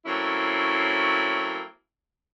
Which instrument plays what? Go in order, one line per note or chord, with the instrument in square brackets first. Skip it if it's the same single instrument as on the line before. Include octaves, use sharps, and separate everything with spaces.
[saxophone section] F#3 A3 A#3 C4 C#4 E4